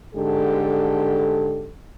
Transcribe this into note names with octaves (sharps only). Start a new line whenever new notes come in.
G#2 D3 G4 A4